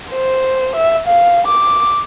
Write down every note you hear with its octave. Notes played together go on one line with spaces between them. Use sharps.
C5
E5
F5
D6